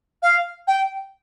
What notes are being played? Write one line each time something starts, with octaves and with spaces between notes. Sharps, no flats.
F5
G5